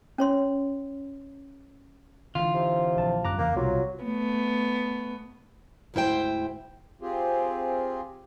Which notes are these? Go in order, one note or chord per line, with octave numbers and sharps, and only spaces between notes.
C#4 C#5 C6
D3 E3 F4
C3
A#1 A5
F#2 E3 G3 A#5 D6 F#6
E2 C#3 A#3
B1 C3 F#3 G3 F4 F#4
A3 B3
D2 G#2 E4 C5 G5
C4 F4 G4 G#4